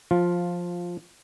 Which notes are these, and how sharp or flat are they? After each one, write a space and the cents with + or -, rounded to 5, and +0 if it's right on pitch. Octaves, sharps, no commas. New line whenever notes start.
F3 +10 F4 +0